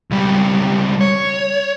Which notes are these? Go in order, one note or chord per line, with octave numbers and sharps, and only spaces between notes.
C#2 G3
C#5